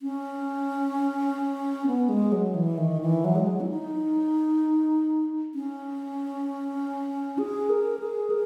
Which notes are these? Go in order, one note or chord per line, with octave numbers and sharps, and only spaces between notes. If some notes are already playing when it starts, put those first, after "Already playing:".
C#4
B3
G#3
F#3
E3
D#3
E3
F#3
G#3
F#3
E4
D#4
C#4
G#4
A#4
G#4
A#4